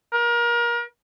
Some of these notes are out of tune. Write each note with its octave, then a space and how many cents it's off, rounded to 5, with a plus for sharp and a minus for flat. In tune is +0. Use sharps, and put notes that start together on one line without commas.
A#4 +30